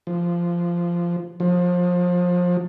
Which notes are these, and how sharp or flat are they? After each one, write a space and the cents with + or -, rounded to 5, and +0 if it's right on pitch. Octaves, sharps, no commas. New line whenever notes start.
F3 -10
F3 +30